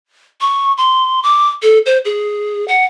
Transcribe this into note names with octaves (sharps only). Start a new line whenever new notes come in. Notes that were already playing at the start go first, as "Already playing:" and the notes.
C#6
C6
D6
A4
C5
G#4
F#5